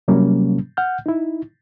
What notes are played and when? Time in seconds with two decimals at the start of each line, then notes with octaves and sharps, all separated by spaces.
0.08 C3 F#3 G3 A#3 C#4
0.77 F#5 F6 G6
1.06 D#4 E4